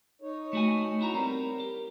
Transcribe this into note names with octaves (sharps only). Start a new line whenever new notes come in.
D#4 C#5
A3 F#4 G#5
E4 F#4 A#5
G3 B3 C4 A#4
G4